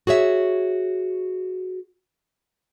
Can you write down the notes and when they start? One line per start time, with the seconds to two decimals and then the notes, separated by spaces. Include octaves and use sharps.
0.07 F#4 G#4 C#5 E5